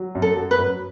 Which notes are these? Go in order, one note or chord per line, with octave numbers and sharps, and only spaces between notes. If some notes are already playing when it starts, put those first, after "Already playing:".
Already playing: F#3
F#2
A4
F#3
B4
F#2